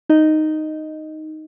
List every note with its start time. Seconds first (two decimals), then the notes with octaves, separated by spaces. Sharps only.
0.09 D#4 D#5